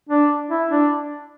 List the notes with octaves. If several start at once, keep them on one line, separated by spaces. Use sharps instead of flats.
D4
E4
D4